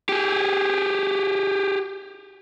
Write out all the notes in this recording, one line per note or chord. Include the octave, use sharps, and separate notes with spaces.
G4 G#4